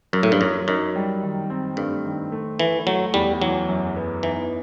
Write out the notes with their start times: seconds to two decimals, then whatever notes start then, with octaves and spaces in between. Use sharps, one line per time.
0.13 F#2 F#3
0.23 A2
0.32 G2
0.41 F#2 F#3
0.68 F#2 D#4
0.96 G3
1.23 D#3
1.50 C4
1.77 G2 A3
2.04 D#3
2.32 A3
2.59 E3 A3
2.87 F#3 A3
3.14 E2 G3
3.41 E3 F#3
3.68 F#2
3.96 B3
4.23 E3 D#4